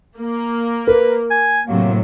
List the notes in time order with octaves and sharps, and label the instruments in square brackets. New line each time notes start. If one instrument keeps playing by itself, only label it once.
[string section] A#3
[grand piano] A#4 [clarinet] B4
[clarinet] G#5
[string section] A2 C3 F#3 [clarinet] A#3